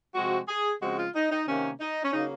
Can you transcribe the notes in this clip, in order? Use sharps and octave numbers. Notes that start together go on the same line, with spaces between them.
C3 F3 G#3 C4 F#4
G#4
C#3 F3 G#3 C4 F#4
F4
D#4
D#4
C3 D#3 A#3 C#4
D#4
C#4
C#3 F#3 A#3 D#4